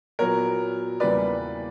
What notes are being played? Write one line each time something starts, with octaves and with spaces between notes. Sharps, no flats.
A#2 F#3 B3 A#4 C#5
E2 C#3 G3 A#3 B4 D5